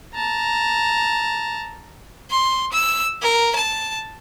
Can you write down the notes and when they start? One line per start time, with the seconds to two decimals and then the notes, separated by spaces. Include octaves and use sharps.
0.14 A5 A#5
2.31 C6
2.73 E6
3.22 A#4
3.56 A5